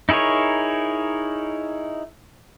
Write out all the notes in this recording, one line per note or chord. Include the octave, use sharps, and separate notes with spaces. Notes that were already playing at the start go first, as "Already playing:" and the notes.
D#4 E4 G#4 A#4 C#5